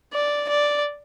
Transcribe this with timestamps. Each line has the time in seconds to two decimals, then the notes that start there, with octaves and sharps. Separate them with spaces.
0.14 D5
0.49 D5